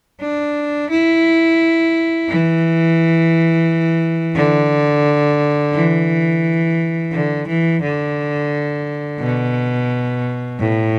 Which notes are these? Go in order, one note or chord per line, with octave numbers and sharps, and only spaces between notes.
D4
E4
E3
D3
E3
D3
E3
D3
B2
A2